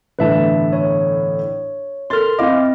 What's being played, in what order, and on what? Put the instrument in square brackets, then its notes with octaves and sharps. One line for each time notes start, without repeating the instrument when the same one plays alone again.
[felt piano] G1 A2 E3 [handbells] B4 E5 A5
[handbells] C#5
[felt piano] A4 A#4 A6 [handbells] C6 F6
[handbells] C4 E4 D#5 [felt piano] F5 D6